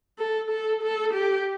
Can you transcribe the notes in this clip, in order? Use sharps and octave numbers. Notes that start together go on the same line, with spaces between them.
A4
A4
A4
G4